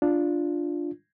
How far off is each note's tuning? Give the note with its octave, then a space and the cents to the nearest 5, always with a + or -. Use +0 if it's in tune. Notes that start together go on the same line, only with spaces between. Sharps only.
D4 +0 F4 +0